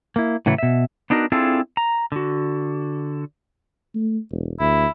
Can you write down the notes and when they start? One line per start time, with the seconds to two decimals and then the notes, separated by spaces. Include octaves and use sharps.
0.16 A#3 E4
0.46 A2 C#3 E3 F#3 A3
0.58 B2 E5
1.10 B3 D4 D#4 F#4 A#4
1.32 C4 D4 E4 F4 G#4 A4
1.77 A#5
2.12 D3 F#4
3.95 A3
4.31 E1
4.60 D2 E4